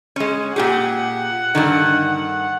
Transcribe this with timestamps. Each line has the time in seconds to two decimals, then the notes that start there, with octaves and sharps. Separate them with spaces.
0.16 G#3 C#4
0.56 A#2 G4 G#4 F#5
1.55 G2 D3 D#3